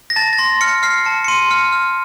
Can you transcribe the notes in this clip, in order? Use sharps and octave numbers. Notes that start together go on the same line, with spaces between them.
A#6
A5 A6
A6
C6 A#6
F6 C#7
F6 C7
A5 C#7
C#7
C6 D#7
F6 C#7
F6